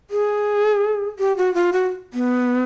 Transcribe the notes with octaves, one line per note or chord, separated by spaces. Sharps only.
G#4
G4
F#4
F4
F#4
B3